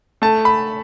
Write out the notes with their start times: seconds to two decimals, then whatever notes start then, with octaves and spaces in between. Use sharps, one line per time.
0.22 A3 A5
0.45 B5